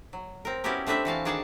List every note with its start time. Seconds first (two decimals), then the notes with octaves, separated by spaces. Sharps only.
0.13 F#3
0.45 C4 A#4
0.64 B3 C#4 E4 F#4 G4 A#4
0.87 A3 C4 D4 B4 E5
1.05 E3 F#4 F5 A5
1.25 D#3 D4 G#4 F#5 G#5 A5